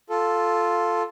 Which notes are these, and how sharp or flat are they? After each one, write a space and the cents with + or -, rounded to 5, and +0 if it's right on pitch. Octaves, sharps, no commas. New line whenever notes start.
F4 +0 A4 +0